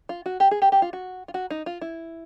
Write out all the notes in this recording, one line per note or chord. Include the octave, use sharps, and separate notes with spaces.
F4
F#4
G4
G#4
G4
G4
F4
F#4
F4
F#4
D#4
F4
E4